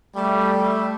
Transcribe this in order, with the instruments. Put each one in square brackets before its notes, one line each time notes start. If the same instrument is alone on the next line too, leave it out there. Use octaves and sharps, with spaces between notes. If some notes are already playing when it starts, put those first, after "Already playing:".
[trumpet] G3 [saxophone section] A3